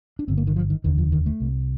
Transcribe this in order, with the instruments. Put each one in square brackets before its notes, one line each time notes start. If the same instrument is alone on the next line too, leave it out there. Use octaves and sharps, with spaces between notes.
[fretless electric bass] D4
G1 G2 D3 C4
A#3
D#3
F3
D#3
F1 D#2 D3 D#3
F3
D#3
A3
C2 C3